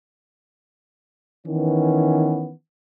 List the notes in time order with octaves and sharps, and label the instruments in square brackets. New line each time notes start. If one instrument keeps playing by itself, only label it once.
[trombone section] D#3 E3 B3 C#4